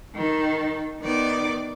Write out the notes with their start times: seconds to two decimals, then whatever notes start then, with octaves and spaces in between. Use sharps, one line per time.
0.15 D#3 A4
1.02 D#3 B3 D5 D6